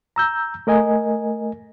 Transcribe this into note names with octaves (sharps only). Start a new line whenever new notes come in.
A#5 E6 G6
A3 A#4 D#5 G#5